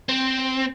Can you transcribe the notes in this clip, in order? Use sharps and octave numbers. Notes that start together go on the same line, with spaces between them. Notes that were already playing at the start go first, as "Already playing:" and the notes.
C4